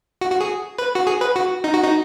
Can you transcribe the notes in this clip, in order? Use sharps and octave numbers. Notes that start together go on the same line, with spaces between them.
F#4
F#4
G#4
B4
F#4
G#4
B4
F#4
D#4
F#4
D#4